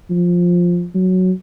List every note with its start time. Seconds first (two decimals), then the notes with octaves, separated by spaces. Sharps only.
0.10 F3
0.94 F#3